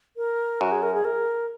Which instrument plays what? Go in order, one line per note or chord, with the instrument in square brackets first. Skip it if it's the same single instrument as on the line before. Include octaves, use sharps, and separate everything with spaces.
[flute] A#4
[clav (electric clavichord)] F#2 [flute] F#4
[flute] G#4
A#4
G#4
A#4